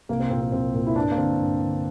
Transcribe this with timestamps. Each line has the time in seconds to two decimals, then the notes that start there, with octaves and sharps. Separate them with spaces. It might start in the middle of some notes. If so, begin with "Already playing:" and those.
0.09 C2 A#3
0.20 C4
0.30 A#2 C4
0.41 C4
0.52 C2 C4
0.74 A#2
0.87 E4
0.95 G2 D4
1.10 A#3
1.17 D3 C4
1.39 G2
1.61 D3